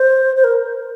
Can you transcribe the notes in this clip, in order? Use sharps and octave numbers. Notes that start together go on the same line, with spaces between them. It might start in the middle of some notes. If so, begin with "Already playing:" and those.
Already playing: C5
C5
A#4